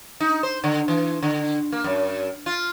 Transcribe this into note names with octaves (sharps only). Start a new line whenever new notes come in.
D#4
C5
D3
E3
D3
A#3
F#2
F4